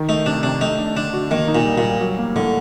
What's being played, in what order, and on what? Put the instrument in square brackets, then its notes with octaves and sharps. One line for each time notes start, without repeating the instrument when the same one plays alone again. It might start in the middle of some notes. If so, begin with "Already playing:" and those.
Already playing: [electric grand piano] D#3
[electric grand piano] A3 [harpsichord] D#4
[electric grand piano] C3 [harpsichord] D4
[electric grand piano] C3 [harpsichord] D4
[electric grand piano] A3 [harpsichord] D#4
[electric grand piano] D4
[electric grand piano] D3 [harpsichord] D4
[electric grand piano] F#4
[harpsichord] D#3 [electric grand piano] A#3
[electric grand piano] D#4
[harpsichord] A#2
[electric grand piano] G3
[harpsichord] A#2
[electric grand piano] G3
F#3
A#3
[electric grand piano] A2 [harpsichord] D3